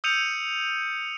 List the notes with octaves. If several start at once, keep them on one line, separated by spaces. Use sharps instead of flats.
D#6 E6 G6 C#7 D#7 F7